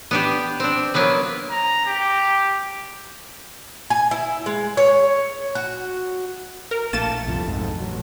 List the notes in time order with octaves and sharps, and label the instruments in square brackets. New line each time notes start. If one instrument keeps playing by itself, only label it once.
[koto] B3 D4 G4
C4 D4
F#3 A#3 B3 B4
[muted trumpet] A#5
G4
[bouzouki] G#5
E4
G#3
C#5
F#4
[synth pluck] A#4
[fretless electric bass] A#1 [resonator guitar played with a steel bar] A3 E4 A4 [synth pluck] A#3 A6 E7
[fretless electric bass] C2 F2 F3
B1 F2 G#2
A1 F#3